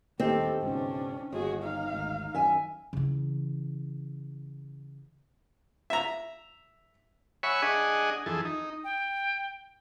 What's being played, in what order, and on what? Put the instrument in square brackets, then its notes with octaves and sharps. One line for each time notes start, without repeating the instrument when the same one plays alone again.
[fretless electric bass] D#1 D#2 A2 [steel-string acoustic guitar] D#3 [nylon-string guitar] C4 [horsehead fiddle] G4 A4
[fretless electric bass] C#2 G#2 B2 [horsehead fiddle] C#4 D4
[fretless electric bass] G1 [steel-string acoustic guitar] D#2 [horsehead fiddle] F#4 G#4
[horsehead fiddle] D#4 F5
[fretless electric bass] G#1 D2
[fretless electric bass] F#2 D#3 [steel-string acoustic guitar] E5 G#5
[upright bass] C#3 E3
[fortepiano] E5 A#5
[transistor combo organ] C#5 E5 F#5 G#5 B5 C#6
D4 G#4 D#5 F#5 G#5
F2 E3 G#4 A4
D#4
[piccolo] G5